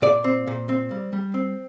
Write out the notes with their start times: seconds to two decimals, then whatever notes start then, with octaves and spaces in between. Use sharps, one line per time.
0.02 A#2 D5
0.24 C4
0.47 A#2
0.69 C4
0.91 G3
1.13 G3
1.34 C4